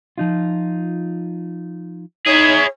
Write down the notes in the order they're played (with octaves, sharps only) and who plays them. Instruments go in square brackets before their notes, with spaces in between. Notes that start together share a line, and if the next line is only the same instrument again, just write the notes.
[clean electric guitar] F3 D#4 F4
[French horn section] D#4 [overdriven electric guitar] E4 G#4 [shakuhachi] C#5